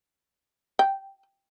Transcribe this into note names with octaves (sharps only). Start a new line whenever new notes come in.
G5